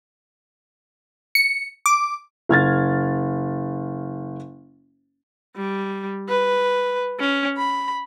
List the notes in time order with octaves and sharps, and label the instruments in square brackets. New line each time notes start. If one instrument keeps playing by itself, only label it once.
[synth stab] C#7
D6
[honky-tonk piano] F#1 F6 G#6 A6
[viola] G3
B4
C#4
B5